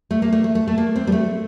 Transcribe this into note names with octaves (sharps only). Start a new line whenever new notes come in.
A3
A#3
A3
A3
A3
A3
A#3
C4
G3
A3